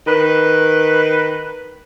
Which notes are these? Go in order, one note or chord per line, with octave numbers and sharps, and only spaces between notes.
D#3 B4